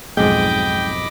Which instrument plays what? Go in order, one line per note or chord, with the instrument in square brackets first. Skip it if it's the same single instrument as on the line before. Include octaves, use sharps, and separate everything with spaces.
[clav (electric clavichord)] B1 F2 G#2 [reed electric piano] G#3 [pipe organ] D#5 B5 D6 [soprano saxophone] G5